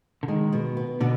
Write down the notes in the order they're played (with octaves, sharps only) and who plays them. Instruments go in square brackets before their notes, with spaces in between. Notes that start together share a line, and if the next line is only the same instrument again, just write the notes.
[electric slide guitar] D3
[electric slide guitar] D#3 [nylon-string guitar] G#3
[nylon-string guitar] B2
B3
[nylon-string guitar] B2 [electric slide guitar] D3